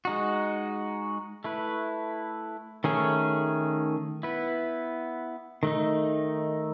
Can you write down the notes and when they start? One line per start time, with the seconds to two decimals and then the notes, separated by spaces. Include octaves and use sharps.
0.05 G#3 D#4 F#4
1.44 A3 E4 B4
2.84 D#3 A3 C#4 G#4 C#5
4.23 B3 E4 B4
5.63 D#3 A3 D#4